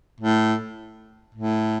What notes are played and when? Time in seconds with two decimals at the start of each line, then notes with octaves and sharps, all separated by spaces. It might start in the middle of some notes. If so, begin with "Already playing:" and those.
0.20 A2
1.34 A2